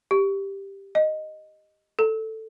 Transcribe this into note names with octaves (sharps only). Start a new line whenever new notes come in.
G4
D#5
A4